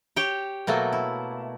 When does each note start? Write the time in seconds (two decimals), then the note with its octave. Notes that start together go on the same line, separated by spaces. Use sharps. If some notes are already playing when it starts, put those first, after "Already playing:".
0.16 G4 C#5 G5
0.67 B2 F#3 A3 A#3
0.93 E4